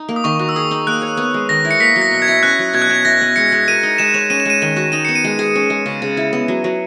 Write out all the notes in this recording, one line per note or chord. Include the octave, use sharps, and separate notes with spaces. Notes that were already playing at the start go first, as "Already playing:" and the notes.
Already playing: D#4
A#3
D#6
D#3 C#6
F#4
E6
G#4 D#6
D#4
A#3 F#6
C#5
B3
G#3
D#3 A#6
E4
C#7
A#3 B6
F#3
A#6
B2
G#6
E4
C#4 F#6
F#3
B2 G#6
F#6
B2 G#6
E4 A#6
B3
G#3 C#7
G#3
A#4 D#7
D#4
G#3 E7
C#5
C#4 D#7
E7
G#3 D#7
D#3 D#7
F#4
D#4 D#7
B3 C#7
D#7
G#3
G#4
C#4
G#3
C#3
C#3
E4
B3
F#3
F#3